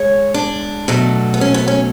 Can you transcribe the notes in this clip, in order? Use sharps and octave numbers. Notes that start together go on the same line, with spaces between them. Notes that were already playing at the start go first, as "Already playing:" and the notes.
Already playing: G#3 C#5
D4
B2 F#3 A3
B3
C#4
B3
C#4